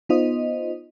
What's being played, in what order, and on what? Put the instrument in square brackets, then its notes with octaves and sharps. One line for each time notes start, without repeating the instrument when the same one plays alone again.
[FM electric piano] B3 D#4 F4 C5 D#5